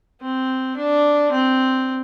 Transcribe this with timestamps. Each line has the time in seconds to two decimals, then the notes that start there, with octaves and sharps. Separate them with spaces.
0.21 C4
0.77 D4
1.32 C4